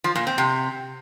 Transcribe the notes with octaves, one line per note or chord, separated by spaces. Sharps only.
F3
A#2
C4
C3